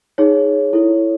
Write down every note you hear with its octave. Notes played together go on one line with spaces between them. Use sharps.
D#4 G#4 C#5
E4 A4 C#5